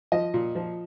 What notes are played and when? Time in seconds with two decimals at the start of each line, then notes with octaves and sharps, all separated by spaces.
0.12 F3 D#5
0.34 A#2
0.55 F3